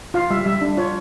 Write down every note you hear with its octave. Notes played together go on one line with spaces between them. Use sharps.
F4 F5
G3 E5
G3 E5
D4
F4 C#5